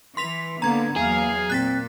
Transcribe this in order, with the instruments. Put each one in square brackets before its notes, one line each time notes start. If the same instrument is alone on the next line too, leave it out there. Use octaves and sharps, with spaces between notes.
[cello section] E3 [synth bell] C6 B6 F7
[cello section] D3 B3 [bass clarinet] A#3 [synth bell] A#5 G#6
[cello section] E2 F#3 F5 [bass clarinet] A#3 [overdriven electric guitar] G#4
[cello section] A#2 [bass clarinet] C4 [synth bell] F#6 A6 B6